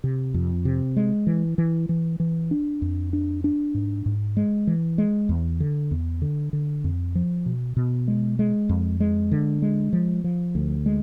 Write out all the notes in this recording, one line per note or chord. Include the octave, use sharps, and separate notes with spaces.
C3
F2
C3
G#3
E3
E3
E3
E3
D4
F2
D4
D4
G#2
G#2
G#3
E3
G#3
E2
D3
E2
D3
D3
F2
F3
B2
B2
G#3
G#3
F2
G#3
D3
G#3
F3
F3
D2
G#3